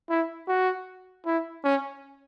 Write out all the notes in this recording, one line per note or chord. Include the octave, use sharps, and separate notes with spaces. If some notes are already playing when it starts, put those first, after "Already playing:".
E4
F#4
E4
C#4